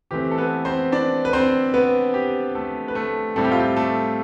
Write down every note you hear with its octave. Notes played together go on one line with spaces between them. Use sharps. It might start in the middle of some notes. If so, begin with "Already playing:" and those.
E3 A3 C4 G4
A4
B3 B4
C4 C5
D4 D5
B4
C4 C5
B3 B4
G4
A3 A4
B4
A3 A4
A2 G3 C4 A4
G4
F4
G4
A3 A4